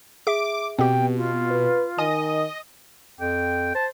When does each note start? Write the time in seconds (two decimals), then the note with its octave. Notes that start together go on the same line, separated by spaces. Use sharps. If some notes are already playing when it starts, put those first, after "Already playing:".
0.27 G#4 E5 D6
0.78 B2 C4 G4 G5
1.16 F4
1.51 B4
1.98 D#3 D#5 G#5
3.20 F2 G5
3.75 C5 A5